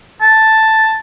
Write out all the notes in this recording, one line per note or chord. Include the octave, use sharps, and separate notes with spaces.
A5